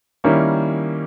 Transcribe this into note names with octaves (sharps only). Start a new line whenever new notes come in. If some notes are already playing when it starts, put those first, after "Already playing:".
D#3 G3 A#3 C#4 E4